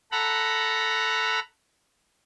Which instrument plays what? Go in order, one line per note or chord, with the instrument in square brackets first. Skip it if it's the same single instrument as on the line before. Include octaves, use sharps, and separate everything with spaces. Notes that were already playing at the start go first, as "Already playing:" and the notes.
[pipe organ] A4 F#5 A#5 B5